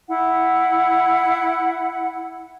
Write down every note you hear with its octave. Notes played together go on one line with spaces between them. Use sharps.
E4 F#5